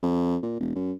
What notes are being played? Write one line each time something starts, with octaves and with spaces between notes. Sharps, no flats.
F2
A#2
E1
F#2